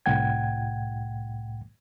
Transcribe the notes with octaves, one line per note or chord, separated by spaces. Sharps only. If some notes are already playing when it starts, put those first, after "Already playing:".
C2 A2 F#5 G5 G#6